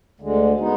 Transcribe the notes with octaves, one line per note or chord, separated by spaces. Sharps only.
D2 D3 G#3
G#3 B3 D#4